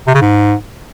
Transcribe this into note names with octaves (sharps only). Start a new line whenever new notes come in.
C3
C#3
G#2